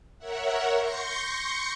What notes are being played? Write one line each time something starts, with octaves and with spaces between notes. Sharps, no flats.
A#4 C#5 E5 F#5
C6 C#6 G6 A#6 C#7